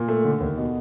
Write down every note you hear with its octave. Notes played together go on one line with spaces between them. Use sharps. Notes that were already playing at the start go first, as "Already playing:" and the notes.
Already playing: A#2
A3
D3
D#2
B2